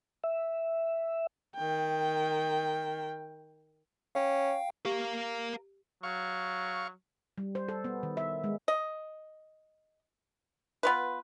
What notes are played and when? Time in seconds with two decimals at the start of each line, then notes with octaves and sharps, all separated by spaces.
0.24 E5
1.56 D#3 G5
4.15 C#4 F5 G5
4.85 G4 A#4 F5
6.03 F#3 F5 C#6
7.38 G3
7.55 C5
7.69 A4
7.85 B3
8.03 D#3
8.17 E5
8.44 G#3
8.68 D#5
10.83 B3 F4 B4